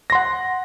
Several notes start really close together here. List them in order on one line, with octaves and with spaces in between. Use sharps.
A#6 C6 F#5